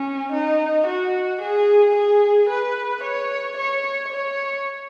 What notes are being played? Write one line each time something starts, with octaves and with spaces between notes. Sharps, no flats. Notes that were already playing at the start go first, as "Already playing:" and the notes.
Already playing: C#4
D#4
F#4
G#4
G#4
B4
C#5
C#5
C#5